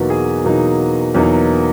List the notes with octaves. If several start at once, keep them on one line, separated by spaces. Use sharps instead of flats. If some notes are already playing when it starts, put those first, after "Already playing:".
Already playing: E2 B2 F#3 A#3 D#4 F#4
G#4
E2 B2 F#3 A#3 D#4
E2 B2 F#3 A#3 D#4